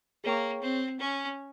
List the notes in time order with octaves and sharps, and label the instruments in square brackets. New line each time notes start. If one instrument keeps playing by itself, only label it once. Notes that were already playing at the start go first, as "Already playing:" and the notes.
[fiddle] A#3 [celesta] G#4 C#5 G5 C#6
[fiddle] C4
C#4